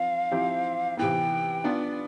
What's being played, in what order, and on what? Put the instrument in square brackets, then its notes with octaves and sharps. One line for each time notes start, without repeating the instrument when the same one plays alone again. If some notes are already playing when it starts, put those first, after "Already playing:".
Already playing: [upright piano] F3 C4 F4 [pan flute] F5
[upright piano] F3 C4 E4 G4 C5
[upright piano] C3 E3 B3 [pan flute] G5
[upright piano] B3 D4 F4